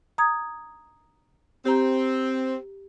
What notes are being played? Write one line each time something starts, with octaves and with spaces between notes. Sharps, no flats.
A#5 D#6 G#6
C4 G4 A#5